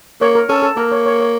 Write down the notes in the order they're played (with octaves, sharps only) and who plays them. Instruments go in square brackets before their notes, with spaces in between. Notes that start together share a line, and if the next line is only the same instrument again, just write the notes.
[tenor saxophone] A#3 [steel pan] C#5
[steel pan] A#4
[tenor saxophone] C#4 [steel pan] A4
[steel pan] A4
[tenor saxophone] A#3 [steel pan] A#4
[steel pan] C#5
C#5
C#5